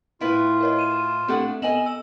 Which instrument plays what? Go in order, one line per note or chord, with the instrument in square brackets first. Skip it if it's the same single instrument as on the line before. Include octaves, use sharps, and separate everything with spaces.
[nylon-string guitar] A2 E4 B4 [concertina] F4
[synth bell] A#4 C#5 D#5
D#7 E7
[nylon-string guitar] A3 D4 F#5 [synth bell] C4 G4 A4
[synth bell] B3 E7 F#7 [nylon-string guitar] A4 D#5 G#5
[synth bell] E6